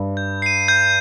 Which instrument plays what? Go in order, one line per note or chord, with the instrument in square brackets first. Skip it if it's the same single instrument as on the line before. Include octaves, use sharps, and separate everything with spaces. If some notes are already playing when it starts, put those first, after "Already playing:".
Already playing: [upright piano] G2
[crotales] G6
C7 D#7
G6